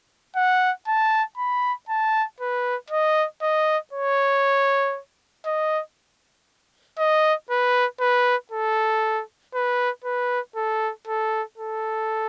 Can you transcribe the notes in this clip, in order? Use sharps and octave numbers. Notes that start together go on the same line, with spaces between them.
F#5
A5
B5
A5
B4
D#5
D#5
C#5
D#5
D#5
B4
B4
A4
B4
B4
A4
A4
A4